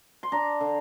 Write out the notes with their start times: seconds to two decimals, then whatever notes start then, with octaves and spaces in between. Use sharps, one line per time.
0.23 C6
0.32 D4 A#5
0.61 D3